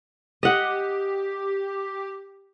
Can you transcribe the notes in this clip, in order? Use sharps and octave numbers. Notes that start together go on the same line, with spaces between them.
G4 D#5 F#5